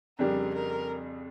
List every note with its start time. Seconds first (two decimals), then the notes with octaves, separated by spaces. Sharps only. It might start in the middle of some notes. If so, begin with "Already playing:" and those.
0.19 F2 C#3 G3 D4 G4 A#4
0.54 A#4